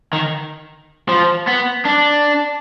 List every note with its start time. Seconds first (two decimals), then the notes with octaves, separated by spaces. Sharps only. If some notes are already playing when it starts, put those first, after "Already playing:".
0.13 D#3
1.09 F3
1.48 B3
1.85 D4